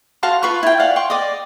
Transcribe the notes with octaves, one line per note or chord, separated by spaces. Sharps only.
F#4 F5 A5 C6
F4 B4 B5 C#6
E4 G5
D5 F5 F#5
G5 C6 C#6
D5 D#5